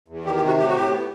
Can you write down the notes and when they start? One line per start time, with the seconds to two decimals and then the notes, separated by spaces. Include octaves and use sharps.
0.08 E2
0.25 D#3 G4
0.36 G4
0.41 C3
0.47 F#4
0.58 A2 G4
0.67 F#4
0.75 A2 G4
0.91 B3